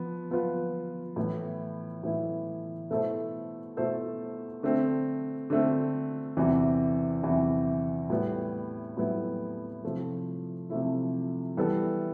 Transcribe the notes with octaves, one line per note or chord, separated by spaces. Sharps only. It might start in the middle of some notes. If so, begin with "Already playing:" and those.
Already playing: F3 B3
F3 B3 F4 B4
A2 E3 B3 E4
A2 E3 B3 E4
B2 A3 E4 A4 C5
B2 A3 E4 A4 C5
D3 A3 C4
D3 A3 C4
E2 C3 E3
E2 C3 E3
A2 G3 B3 E4
A2 G3 B3 E4
C3 F3 A3 E4
C3 F3 A3 E4
E3 G3 B3 E4 A4